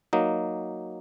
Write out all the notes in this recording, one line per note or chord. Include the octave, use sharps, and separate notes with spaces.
F#3 A#3 D#4